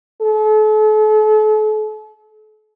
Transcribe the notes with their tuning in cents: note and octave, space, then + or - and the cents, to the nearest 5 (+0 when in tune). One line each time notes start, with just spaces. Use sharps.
A4 -40